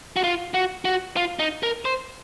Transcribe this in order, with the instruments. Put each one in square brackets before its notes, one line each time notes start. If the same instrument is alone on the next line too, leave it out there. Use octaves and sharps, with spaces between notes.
[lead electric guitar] F#4
F4
F#4
F#4
F4
D#4
A#4
C5